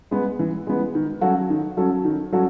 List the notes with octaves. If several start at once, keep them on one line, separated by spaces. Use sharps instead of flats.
G#3 B3
E3
G#3 B3
D#3
F#3 C#4 F#4 A4
D#3
F#3 C#4 F#4 A4
D#3
F#3 C#4 F#4 A4